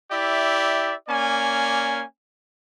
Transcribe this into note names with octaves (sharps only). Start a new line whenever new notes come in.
E4 G4 D5 E5
A#3 C#4 D5 G#5